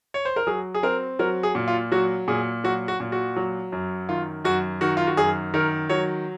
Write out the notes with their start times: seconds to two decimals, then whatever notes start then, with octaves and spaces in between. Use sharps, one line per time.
0.14 C#5
0.25 C5
0.36 A#4
0.47 F#3 G#4
0.74 G#4
0.83 C4 A#4
1.19 F#3 A#4
1.43 G#4
1.55 A#2
1.68 F4
1.92 F#3 F#4
2.28 A#2 G#4
2.64 F#3 F#4
2.88 F#4
3.00 A#2
3.12 F#4
3.36 F#3
3.72 F#2
4.09 D#3 F4
4.45 F#2 F#4
4.81 D#3 F#4
4.97 F4
5.07 F#4
5.17 F#2 G#4
5.54 D#3 A#4
5.89 F#3 C#5